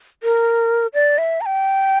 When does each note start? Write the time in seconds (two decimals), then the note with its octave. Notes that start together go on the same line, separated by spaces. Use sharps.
0.23 A#4
0.94 D5
1.18 E5
1.41 A#5
1.46 G5